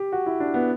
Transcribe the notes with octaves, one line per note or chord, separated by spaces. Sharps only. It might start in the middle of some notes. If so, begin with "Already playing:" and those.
Already playing: G4
F#4
E4
D4
B3